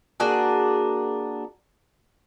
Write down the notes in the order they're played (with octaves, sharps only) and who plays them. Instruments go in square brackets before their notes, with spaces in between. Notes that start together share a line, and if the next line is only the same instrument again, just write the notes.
[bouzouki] A#3 D4 F#4 G#4